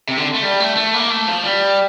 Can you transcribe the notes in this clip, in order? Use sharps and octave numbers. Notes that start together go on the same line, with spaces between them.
C3
D3
A3
G3
A3
A3
A#3
A3
F3
G3